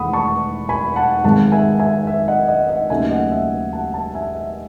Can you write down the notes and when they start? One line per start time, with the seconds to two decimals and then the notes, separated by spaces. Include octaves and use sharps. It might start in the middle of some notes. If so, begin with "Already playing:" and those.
Already playing: E1 E2 D#3 A3 F#5 B5 D#6
0.13 A5 C#6
0.69 G#5 B5
0.96 F#5 A5
1.24 G#1 G#2 D#3 G#3 F#5 A5
1.52 E5 G#5
1.79 E5 G#5
2.07 E5
2.28 D#5 F#5
2.48 D#5 F#5
2.69 D#5 F#5
2.90 D#2 C#3 F#3 A3 D#4 E5 G#5
3.11 D#5 F#5
3.32 E5
3.73 F#5 A5
3.94 F#5 A5
4.15 E5 G#5
4.35 E5